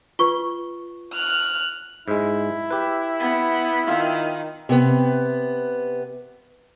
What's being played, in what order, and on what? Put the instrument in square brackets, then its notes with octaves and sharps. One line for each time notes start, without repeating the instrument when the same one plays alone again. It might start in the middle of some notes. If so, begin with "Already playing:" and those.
[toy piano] F4 [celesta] B4 C#6 G7
[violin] F6 F#6
[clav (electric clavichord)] G#2 G#3 [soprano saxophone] E4
[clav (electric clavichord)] G4 B4
[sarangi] B3
[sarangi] D#3 [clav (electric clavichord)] F4 E5
[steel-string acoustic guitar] C3 B3